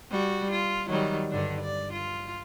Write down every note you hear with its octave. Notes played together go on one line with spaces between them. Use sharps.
G3 F#4
F4
D#3 F#3 G3
G2 D3 D4
D5
F4